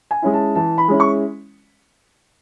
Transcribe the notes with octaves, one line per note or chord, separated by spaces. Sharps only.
G#5
G#3 C#4 E4
A5
E3 A5
B5
G#3 C#4 E4
C#6